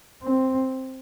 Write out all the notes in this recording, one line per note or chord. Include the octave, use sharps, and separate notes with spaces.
C4